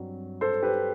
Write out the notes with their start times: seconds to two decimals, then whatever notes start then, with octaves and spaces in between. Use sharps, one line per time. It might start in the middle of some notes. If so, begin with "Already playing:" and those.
Already playing: G2 F#3 C4
0.41 A4 C5
0.63 G4 B4